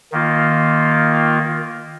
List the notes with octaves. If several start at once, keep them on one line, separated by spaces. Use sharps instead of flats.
D#3 A#3 F4